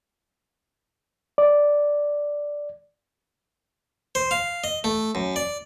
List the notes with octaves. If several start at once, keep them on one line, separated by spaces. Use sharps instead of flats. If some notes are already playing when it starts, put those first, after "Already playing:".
D5
C5
F5
D#5
A3
F#2
D5